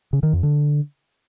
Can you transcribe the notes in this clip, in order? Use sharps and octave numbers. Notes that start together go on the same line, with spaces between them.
C#3
D#3
F2
D3